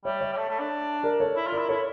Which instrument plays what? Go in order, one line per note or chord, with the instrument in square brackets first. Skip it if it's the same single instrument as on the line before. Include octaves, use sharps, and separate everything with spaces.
[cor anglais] G3 [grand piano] C#5 E5
[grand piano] C#5 E5
[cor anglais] G3
A3
A3
D4
[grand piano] A#4 D5
A4 C#5
[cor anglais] E4
F4
[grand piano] A#4 D5
[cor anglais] E4
[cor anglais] E4 [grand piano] A4 C#5